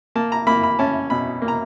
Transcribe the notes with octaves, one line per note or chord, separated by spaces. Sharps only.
A#3 A5
A#5
A#3 B5
B5
C#4 A5
B2 B5
A#3
A#5